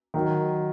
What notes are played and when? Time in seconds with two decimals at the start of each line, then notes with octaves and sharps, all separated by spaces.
0.14 D#3 F#3